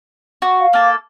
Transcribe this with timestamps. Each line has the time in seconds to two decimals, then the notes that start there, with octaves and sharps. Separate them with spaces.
0.42 F#4
0.60 F5
0.73 A#3 A4